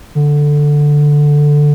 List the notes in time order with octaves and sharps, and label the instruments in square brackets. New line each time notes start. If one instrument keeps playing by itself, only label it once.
[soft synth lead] D3